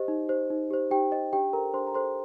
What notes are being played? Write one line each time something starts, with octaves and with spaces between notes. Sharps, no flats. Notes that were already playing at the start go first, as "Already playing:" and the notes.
Already playing: G4 C5 D#5
D#4
G4 C5
D#4
G4 C5
D#4 G4 G5
G4 C5 D#5
D4 G4 G5
A4 A#4 C5 A#5
D4 C5 C6
A#5
A4 C5 C6